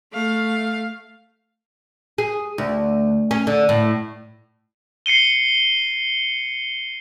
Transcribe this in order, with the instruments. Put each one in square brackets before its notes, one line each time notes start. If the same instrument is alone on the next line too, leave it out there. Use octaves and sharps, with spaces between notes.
[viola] A3 F5
[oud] G#4
D2
C#4
D3
A2
[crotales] C7 C#7 D#7 G7